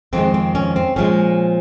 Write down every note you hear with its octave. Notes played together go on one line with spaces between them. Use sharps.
F2 D#3 G#3 C4
C4
C#4
C4
A#2 F3 G#3 C#4